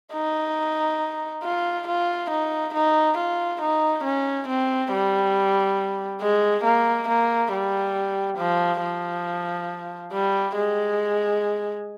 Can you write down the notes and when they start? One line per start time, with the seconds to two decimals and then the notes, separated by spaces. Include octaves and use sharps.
0.13 D#4
1.44 F4
1.88 F4
2.30 D#4
2.74 D#4
3.18 F4
3.61 D#4
4.04 C#4
4.48 C4
4.92 G3
6.21 G#3
6.64 A#3
7.08 A#3
7.52 G3
8.38 F3
8.81 F3
10.12 G3
10.55 G#3